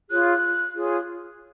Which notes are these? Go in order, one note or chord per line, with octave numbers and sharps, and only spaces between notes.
F4 G#4 C#5 F#6
F4 G#4 C#5